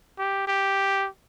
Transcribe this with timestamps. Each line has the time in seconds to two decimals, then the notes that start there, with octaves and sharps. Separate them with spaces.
0.19 G4
0.47 G4